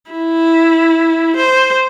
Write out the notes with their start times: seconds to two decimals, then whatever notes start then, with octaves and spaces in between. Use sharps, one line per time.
0.11 E4
1.36 C5